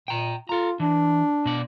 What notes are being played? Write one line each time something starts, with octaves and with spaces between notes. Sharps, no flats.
A#2 G5 A#5
F4 A4 A#5
E3 D4
B2 D5